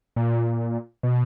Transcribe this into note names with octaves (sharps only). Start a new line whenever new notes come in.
A#2
B2